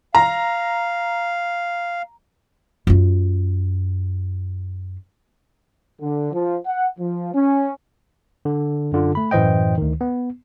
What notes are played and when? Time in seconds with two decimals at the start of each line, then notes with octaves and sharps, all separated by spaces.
0.15 F5 A#5
2.87 F#2 F4
6.00 D3
6.32 F3
6.66 F#5
6.98 F3
7.33 C#4
8.45 D3
8.92 F#2 D3 F4
9.15 A3 B5
9.31 F#2 A2 E3 C5 D#5 G5
9.78 D2 D#3
10.01 B3